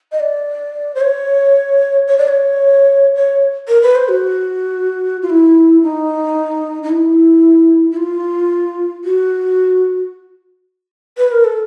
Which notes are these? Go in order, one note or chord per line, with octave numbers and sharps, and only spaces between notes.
D#5
D5
C5
C#5
C#5
D5
C#5
C#5
A#4
B4
C5
F#4
F4
E4
D#4
D#4
E4
E4
F4
F#4
B4
A#4
A4